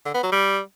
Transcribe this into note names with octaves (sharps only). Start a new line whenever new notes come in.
D3
B3
F#3
G3